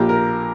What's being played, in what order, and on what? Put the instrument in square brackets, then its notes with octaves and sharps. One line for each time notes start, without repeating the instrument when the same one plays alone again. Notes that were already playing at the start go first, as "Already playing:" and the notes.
Already playing: [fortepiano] A#1 A#2 A#3 G4
A#4